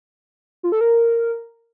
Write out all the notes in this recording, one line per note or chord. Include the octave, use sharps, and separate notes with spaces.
F4
A4
A#4